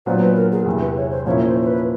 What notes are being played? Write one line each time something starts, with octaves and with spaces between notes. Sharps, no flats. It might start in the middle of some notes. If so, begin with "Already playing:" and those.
A#2 F#3 B3 D4 C5
B4
A#4
G#4
E2 C3 E3
B4
C#5
C5
A#2 F3 A#3 C#4 E4 C#5
C5
C5
B4